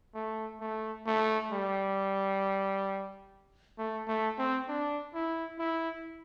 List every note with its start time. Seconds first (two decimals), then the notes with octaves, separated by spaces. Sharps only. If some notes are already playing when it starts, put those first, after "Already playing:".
0.15 A3
0.61 A3
1.07 A3
1.52 G3
3.78 A3
4.08 A3
4.38 C4
4.68 D4
5.14 E4
5.58 E4